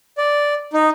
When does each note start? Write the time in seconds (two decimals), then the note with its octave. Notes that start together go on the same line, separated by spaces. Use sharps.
0.18 D5
0.73 D#4